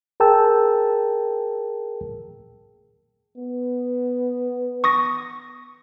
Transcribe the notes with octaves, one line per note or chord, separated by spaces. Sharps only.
G#4 A#4 G5 A5 E6
B3
C#6 D#6 A#6